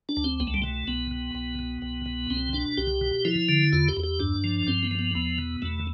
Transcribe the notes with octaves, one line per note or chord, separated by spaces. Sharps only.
D4
D2
C4
C2 B3
A3
G3
B2 A3
C2 B3
B2
C2
B2
C2
B2
C2 C4
B2 D4
C2 G4
B2
F3 E4
D3
E2 F4
G4
E2
G4
G2 D4
F3
G2 C4
B3
F3
B3
E2 B3
B2
E2 A3